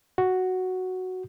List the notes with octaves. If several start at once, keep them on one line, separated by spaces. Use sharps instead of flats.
F#4